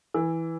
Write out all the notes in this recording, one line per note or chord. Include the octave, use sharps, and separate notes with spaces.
E3